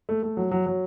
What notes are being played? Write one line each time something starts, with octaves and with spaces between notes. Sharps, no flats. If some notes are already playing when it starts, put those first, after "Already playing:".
A3
A3
F#3
F#3
F#3